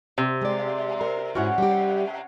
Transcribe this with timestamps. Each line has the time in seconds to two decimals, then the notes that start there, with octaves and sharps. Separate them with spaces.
0.18 C3 C4
0.42 G#3 D5
1.01 A#4 C5
1.35 G#2 C#4 E4 F#4 C#5 F#5
1.58 G3 G4